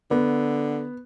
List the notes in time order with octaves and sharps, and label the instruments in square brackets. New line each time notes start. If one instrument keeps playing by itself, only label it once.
[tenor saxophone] D3 [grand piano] B3